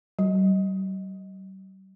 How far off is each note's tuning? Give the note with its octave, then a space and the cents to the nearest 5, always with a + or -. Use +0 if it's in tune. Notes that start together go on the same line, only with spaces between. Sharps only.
G3 -45